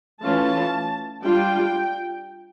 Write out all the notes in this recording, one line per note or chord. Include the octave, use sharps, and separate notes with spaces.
E3 A3 C#4 F4 A5
G3 D4 F4 G5